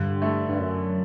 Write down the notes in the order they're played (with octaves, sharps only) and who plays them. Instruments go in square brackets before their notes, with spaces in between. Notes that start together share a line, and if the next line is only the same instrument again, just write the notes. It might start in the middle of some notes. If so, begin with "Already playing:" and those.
Already playing: [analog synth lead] G2 [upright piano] D3
[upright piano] A3
[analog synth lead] G2
F#2